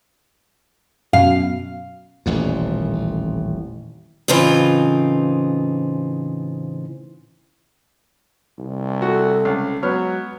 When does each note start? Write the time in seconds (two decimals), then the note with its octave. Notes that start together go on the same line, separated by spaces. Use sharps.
1.13 F#2 B2 F5
2.26 D#1 A1 F2
4.28 A2 C#3 E3 C4 D#4 F4
8.59 C2
9.02 F#4 A4
9.45 C#2
9.83 F#3 G#3 B3 C#5 F6